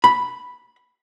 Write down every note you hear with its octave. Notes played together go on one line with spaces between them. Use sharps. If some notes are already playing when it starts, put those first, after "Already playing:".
B5